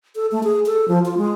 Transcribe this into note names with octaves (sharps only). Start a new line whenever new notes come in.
A4
A3
G#4
A4
F3
F4
G#3